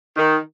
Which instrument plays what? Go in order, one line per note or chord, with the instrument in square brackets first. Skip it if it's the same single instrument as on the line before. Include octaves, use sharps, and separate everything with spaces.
[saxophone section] D#3